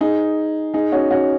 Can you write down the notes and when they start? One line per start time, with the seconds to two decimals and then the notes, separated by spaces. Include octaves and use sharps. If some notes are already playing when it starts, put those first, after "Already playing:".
0.01 D#4 G#4
0.74 D#4 G#4
0.92 C#4 F#4
1.10 C#4 F#4